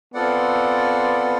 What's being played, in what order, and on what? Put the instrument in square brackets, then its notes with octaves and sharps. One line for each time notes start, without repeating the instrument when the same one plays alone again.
[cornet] B3 [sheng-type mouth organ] C4 F4 A4 D5 F#5